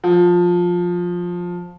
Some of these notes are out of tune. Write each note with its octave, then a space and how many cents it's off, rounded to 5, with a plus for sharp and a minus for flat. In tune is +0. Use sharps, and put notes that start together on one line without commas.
F3 +15